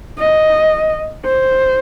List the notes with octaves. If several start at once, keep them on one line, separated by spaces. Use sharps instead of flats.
D#5
C5